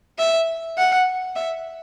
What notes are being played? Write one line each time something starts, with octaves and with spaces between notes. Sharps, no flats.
E5
F#5
E5